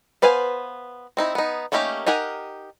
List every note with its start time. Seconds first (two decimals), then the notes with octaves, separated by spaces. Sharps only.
0.22 B3 B4 C5 F5 G#5
1.17 C4 D#4 E4
1.35 B3 D#4
1.72 A3 A#3 C#4 D#4 G4
2.06 D#4 G4 A#4 F#5 G#5